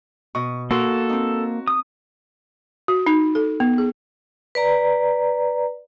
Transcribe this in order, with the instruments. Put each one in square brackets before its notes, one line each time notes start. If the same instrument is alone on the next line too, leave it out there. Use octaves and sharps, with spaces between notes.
[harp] B2 D#5 [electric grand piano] C#6
[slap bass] A#3 [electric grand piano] F#4 [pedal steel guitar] A4 [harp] C6
[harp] C4 D#4
[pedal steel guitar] D#6
[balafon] F#4
D#4
A4
B3
G#4
[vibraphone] B4 D5 A#5